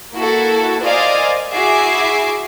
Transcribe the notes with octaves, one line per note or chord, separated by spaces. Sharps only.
A#3 E4 F#4 A4
A#4 C5 D5 D#5 F5 G#5
E4 F#4 G#4 E5 D6 C7